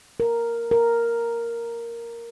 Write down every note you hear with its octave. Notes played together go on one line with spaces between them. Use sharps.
A#4
A#4